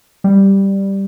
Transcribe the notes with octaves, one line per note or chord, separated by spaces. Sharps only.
G3